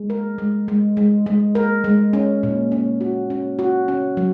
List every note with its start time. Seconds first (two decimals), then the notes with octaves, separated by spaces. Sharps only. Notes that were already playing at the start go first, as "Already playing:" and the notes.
Already playing: G#3
0.10 A#4
0.38 G#3
0.68 G#3
0.97 G#3
1.26 G#3
1.55 A#4
1.84 G#3
2.13 C#4
2.43 A#2
2.72 C#4
3.01 F#4
3.30 C#4
3.59 F#4
3.88 C#4
4.17 F#3